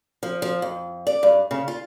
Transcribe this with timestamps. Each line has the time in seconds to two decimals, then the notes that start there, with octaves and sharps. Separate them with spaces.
0.23 F3
0.42 F3
0.62 F2
1.07 D5
1.23 G2
1.51 C#3
1.68 F4